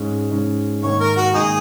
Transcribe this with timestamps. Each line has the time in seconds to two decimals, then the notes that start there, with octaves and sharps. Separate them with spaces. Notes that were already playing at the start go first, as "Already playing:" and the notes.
Already playing: G#2 G#3 C#4
0.31 G#2 G#3 C#4
0.83 G#2 D#3 A#3 C#5
1.00 A#4
1.17 F#4
1.34 G#2 D#3 A#3 D#4 G#4